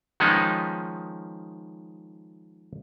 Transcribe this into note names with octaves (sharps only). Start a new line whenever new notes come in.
D#3 F3 G#3 B3 C#4 D#4